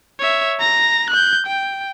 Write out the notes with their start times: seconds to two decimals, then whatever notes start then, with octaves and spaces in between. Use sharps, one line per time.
0.19 C#5 E5
0.60 A#5 A#6
1.10 F#6 G6
1.46 G5